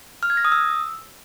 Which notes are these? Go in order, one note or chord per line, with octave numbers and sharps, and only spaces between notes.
F6
G#6
A#6
D#6
E6